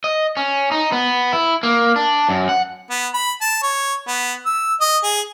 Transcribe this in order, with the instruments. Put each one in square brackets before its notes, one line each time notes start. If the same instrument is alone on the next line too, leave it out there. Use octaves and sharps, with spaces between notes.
[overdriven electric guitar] D#5
C#4
D#4
B3
E4
A#3
D4
F#2
F#5
[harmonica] B3
B5
A5
C#5
B3
E6
D#5
G#4